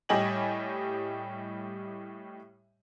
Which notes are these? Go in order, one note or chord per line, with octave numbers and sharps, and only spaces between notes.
A2 G3 G4 D#5 G#5 F#7